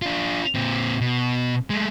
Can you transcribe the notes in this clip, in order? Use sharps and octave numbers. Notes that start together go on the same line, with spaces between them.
D4 F4
A#2 C4
B2
G#3 A3